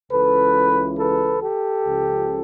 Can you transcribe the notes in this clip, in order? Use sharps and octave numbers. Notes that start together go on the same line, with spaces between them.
C#2 C#3 E3 A4 B4
A4 B4
G4 A4
C#2 C#3 F3